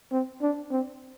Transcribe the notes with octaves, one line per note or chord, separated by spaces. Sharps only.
C4
D4
C4